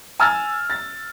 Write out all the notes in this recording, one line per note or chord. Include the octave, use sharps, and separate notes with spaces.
G#5 E6 F6 A6
A6